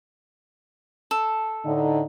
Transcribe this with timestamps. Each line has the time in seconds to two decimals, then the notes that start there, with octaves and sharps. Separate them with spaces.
1.11 A4
1.64 A2 D3 D#4